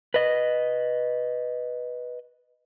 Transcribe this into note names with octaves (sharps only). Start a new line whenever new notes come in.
B4 D#5